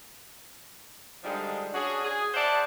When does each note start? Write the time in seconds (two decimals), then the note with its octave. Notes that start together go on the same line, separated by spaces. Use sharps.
1.24 D3 F3 G3 G#3 D4 D#4
1.74 C#4 D4 F#4 G#4
2.04 G#4
2.34 G#4 C5 D5 E5 F#5 A5